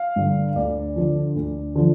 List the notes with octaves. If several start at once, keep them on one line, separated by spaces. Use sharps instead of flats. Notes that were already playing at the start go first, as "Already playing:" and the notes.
Already playing: F5
G2 D3
D2 D5
D3 F3
D2
D3 F3